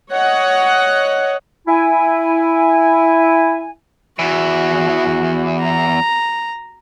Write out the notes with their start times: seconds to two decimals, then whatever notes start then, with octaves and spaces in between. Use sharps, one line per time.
0.12 C#5 D#5 F#5
1.67 E4 G#5
4.19 E2 E3 F#4
5.61 A#5